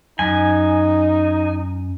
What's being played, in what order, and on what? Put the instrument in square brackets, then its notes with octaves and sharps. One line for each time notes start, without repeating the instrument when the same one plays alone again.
[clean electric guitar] F#2 [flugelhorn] D#4 [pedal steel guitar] G#5